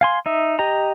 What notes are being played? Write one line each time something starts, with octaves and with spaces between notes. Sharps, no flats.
F5 G#5 C6
D#4 E5
G4 D#5 A#5